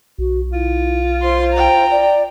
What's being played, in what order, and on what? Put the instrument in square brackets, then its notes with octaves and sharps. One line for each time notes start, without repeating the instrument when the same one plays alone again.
[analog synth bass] B1 [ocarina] F#4
[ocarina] E4 [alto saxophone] F4
[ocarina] C5 [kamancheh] C6
[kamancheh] G5 A#5
[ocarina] D5